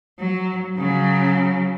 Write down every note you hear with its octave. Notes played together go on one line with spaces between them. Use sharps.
F#3
C#3 F#3